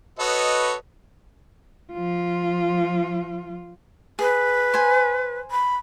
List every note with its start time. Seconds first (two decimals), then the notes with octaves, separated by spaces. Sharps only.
0.19 F#4 A4 B4 C#5 D#5
1.93 F3 F4
4.19 G#4 B4
4.74 C5 G#5
5.51 B5